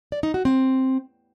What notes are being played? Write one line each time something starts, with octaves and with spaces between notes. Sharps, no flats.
D5
D#4
F#4
C4